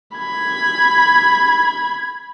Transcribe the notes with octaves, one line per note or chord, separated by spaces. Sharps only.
B5 G#6